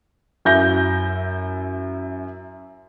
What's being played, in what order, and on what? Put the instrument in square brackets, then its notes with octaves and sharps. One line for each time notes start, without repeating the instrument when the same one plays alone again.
[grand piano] F#2 E4 G6 A#6 G7